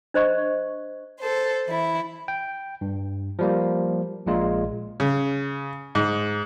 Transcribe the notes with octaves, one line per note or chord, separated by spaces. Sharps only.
D4 C5 D#5 C#6
A4 C5
E3 E4
G5
G2
F3 G3 A#3
A#1 A#2 G#3 F4
C#3
G#2